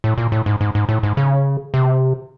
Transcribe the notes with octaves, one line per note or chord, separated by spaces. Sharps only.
A2
A#2
A2
G#2
G#2
G#2
A2
G#2
C#3
C3